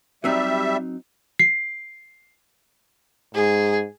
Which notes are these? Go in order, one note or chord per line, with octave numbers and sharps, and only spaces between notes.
F#3 G3 C4 D#4 E5
C7
G#2 G#4